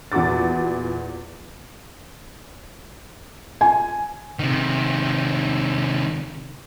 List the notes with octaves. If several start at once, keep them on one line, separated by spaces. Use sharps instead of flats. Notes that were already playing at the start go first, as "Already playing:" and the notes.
E2 A#2 F#4 D6 A6
G#5
C3 D#3